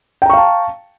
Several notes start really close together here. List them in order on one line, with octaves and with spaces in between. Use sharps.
G5 A#5 C#6 F5 A5